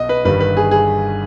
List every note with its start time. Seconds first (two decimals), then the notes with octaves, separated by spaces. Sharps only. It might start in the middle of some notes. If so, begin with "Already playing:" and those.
Already playing: B1 B2 D#5
0.09 B4
0.25 G1 G2 D#3 G3 B4
0.40 B4
0.57 G#4
0.71 G#4